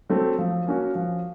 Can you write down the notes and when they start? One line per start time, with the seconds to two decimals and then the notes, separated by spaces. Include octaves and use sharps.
0.09 F#3 A3 C4
0.38 F3
0.67 A#3 C#4 F#4
0.95 F3